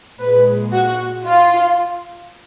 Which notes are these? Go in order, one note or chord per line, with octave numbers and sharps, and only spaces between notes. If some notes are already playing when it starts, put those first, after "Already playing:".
A#2 G#3 B4
F#4
F4